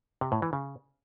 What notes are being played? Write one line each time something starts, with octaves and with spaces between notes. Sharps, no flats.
C3
A2
E3
C#3